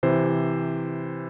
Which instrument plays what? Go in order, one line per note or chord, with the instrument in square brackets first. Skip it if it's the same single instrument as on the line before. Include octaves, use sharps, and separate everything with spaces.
[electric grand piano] C3 E3 C5